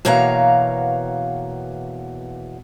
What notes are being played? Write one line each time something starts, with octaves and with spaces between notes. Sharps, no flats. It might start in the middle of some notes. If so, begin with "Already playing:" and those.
E2 B2 A#3 C#5 F5 A#5